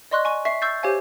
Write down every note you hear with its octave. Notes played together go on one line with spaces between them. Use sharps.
D5 D#5 C6 C#6 F#6
G#5 C#6
E5 C#6 C7
C#6 E6 G6 A6 C7
G4 C5 C#5 F5 G#5